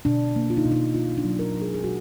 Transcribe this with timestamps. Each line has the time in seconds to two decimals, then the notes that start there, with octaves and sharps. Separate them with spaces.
0.05 B2 D4
0.36 A#3
0.50 F4
0.57 D#4
0.64 B2 D4
0.72 D#4
0.94 A#3 F4
1.18 D4
1.24 F#3
1.39 A#4
1.54 F#3
1.62 G#4
1.74 G#4
1.84 B2 F#4